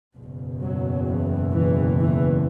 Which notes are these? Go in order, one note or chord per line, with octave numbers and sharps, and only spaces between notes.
F#1 E2 B2
F#3
E3
E3
E3